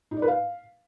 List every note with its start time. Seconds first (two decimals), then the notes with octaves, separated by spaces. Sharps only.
0.11 D#4
0.17 D5
0.22 B4
0.28 F5